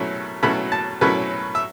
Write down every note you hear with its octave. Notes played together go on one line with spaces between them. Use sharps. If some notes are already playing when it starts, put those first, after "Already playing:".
Already playing: B2 F#3 A3 C#4 E4
B2 F#3 A3 C#4 E4 B5
A5
B2 F#3 A3 C#4 E4 B4
E5